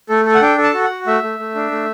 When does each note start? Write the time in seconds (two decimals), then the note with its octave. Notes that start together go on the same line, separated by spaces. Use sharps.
0.09 A3 A4
0.25 A4
0.35 F#5
0.41 D4 G5
0.58 A4
0.63 A5
0.74 F#4
0.84 F#5
0.90 F#4
1.07 A3 E5
1.23 A3
1.39 A3
1.55 D4
1.71 A3